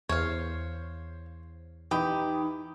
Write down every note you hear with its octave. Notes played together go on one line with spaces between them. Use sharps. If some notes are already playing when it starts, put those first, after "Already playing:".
E2 C5 C#5 F5
E3 D#4 G4 G5 B5 D#6